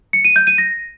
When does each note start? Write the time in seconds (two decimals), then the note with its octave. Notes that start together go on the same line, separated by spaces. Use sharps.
0.13 C#7
0.25 D#7
0.36 G6
0.47 D#7
0.58 A#6